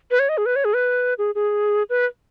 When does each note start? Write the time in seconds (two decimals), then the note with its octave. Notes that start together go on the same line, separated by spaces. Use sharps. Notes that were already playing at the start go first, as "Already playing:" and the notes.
0.11 B4
0.19 C#5
0.29 D#5
0.38 G#4
0.46 B4
0.56 C#5
0.65 G#4
0.74 B4
1.18 G#4
1.35 G#4
1.90 B4